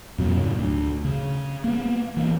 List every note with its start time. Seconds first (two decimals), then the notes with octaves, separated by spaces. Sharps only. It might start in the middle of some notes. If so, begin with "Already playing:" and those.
0.18 F2 B2 F#3 A#3
0.40 G#2 C#3
0.58 D2
1.05 C#3
1.64 A#3 B3
2.17 E3 A#3